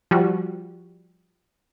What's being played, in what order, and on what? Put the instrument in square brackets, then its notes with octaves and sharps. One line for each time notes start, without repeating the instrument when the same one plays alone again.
[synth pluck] F3 G3 F#4